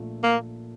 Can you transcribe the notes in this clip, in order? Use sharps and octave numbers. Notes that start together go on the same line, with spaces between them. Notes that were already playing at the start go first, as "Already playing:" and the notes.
Already playing: A#1 A#2 A3
A#3